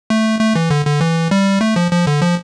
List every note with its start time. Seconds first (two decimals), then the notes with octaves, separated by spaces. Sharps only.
0.10 A3
0.40 A3
0.56 E3
0.70 D3
0.86 D3
1.01 E3
1.31 G3
1.61 A3
1.76 F3
1.91 F3
2.07 D3
2.22 F3